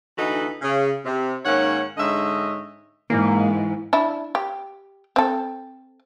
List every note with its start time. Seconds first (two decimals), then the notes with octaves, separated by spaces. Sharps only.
0.17 D2 E3 D#4 F#4 A4 B4
0.62 C#3
1.04 C3
1.45 G#2 D#3 A#3 C#4 C#5 F#5
1.97 G#2 D3 G#3 C#5 D#5 E5
3.10 G#2 E3 A#3
3.93 D4 E4
4.35 G4
5.16 C4 A4